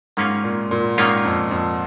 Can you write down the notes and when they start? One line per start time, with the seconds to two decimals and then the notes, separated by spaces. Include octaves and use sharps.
0.17 G#2 D#3 A#3 C#4 F4
0.44 A#2
0.71 A#2
0.97 G#2 D#3 A#3 C#4 F4
1.25 F2
1.51 F2